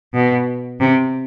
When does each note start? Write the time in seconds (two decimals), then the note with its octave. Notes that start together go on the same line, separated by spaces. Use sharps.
0.14 B2
0.80 C3